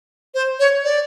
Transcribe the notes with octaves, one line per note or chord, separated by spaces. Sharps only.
C5
C#5
D5